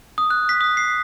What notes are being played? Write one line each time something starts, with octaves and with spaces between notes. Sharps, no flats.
D#6
F#6
B6
D#6
C7